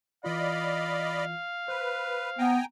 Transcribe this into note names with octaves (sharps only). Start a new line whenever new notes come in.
E3 F4 D5 D#5 F5 B5
B4 C5
B3 G5 G#5 A#5